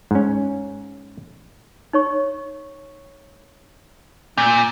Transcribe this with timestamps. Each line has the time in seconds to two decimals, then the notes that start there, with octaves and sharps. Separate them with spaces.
0.11 G#2 C#4
1.93 D#4 C#5 C#6
4.37 A#2 G6